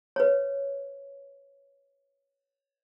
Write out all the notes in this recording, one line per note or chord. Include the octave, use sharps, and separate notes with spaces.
B4 C#5